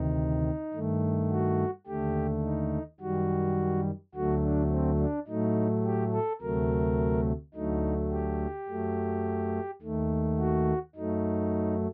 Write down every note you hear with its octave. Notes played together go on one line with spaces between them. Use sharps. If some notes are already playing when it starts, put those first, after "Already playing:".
Already playing: D2 C3 D#3 D#4
G2 D#3 A3
F#4
D#2 D3 A3 G4
D#4
F#2 D#3 G3 F#4
D2 D3 F#3 A3 F#4
D4
C4
D4
A2 F#3 A3 D#4
G4
A4
D2 C3 F#3 A3 A#4
D2 D3 F#3 A3 D#4
G4
F#2 F#3 A3
D#2 D#3 A3
F#4
F#2 F#3 A3 D#4